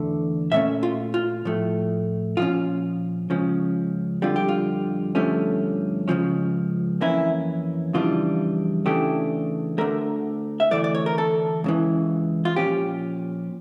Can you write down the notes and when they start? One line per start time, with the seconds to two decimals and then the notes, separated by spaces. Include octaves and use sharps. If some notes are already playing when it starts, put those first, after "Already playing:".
Already playing: E2 D3 A3
0.52 A#2 A3 C#4 E5
0.83 F4
1.14 F4
1.45 A2 F3 A3
2.37 A#2 F3 C#4 F4
3.30 C#2 C#3 F3 C#4
4.22 F2 D3 G3 F4
4.36 G4
4.48 F4
5.15 G2 D3 F3 A3 C#4
6.08 C#2 C#3 F3 C#4
7.01 F2 E3 A#3 C#4 E4
7.93 F2 C#3 E3 G3 D4 F4
8.86 C#3 E3 A3 D4 G4
9.78 D2 D3 A3 A#4
10.60 E5
10.71 D2 C#3 E3 A3 D5
10.84 D5
10.95 C#5
11.06 A#4
11.18 A4
11.64 C#2 C#3 E3
12.45 F4
12.56 A#2 F3 C#4 G4